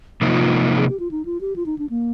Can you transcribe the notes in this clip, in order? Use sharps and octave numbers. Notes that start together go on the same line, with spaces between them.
C3 F3 A#3 D#4 F4
G#4
G4
F4
D#4
F4
G4
F4
D#4
D4
A#3